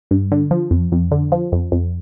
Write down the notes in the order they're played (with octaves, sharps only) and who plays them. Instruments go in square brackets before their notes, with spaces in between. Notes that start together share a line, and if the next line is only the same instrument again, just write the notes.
[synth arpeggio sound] G2
D3
F3
F2
F2
D3
F3
F2
F2